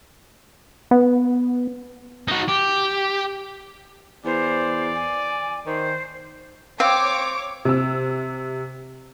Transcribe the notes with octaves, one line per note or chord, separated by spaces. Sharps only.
B3
D#4 F#4
G4
E2 C5 D5
G#5
D#3 C5
C4 C#5 F5 G5 D6
C3 E6